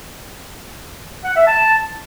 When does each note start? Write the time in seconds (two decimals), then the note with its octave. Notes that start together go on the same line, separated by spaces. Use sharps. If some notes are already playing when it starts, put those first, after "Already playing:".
1.24 F#5
1.36 E5
1.47 A5